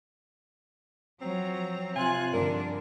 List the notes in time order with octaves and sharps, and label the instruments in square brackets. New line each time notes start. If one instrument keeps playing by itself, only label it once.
[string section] F3 A#5 [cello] F#3 [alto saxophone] C4
[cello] C3 F4 [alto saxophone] G#5 [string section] F#6
[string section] G2 D3 F3 [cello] D4 [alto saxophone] A#4